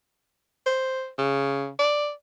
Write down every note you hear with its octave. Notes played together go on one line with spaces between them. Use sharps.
C5
C#3
D5